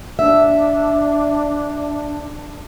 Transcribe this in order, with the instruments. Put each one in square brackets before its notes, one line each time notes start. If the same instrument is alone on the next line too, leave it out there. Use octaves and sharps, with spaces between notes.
[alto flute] D4 [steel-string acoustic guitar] E5